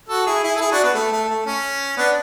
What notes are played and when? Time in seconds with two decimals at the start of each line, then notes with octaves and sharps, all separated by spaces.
0.09 F#4 A4
0.26 E4 G#4
0.43 E4 G#4
0.56 A4
0.60 E4 G#4
0.72 D4 F#4
0.83 B3
0.94 A3
1.12 A3
1.28 A3
1.46 C#4
1.97 B3 D4